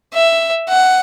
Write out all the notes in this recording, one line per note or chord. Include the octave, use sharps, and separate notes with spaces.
E5
F#5